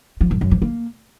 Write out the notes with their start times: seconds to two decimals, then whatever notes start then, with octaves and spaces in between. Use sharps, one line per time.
0.21 F3
0.31 F#2
0.41 F#2
0.51 F3
0.62 A#3